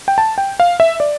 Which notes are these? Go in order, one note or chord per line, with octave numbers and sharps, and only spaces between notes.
G5
A5
G5
F5
E5
D5